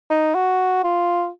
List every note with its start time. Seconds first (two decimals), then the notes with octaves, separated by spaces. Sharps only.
0.10 D#4
0.35 F#4
0.84 F4